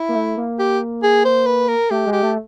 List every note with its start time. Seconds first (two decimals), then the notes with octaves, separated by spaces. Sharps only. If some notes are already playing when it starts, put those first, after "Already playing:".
Already playing: E4
0.09 A#3
0.15 A3
0.37 A#3
0.59 G4
1.03 G#4
1.25 C5
1.46 B4
1.68 A#4
1.90 A3 G4
2.07 G#3
2.12 G4
2.23 A3